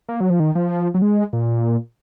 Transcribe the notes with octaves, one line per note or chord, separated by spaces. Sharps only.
A#3
F#3
F3
D#3
F3
F#3
G#3
A#2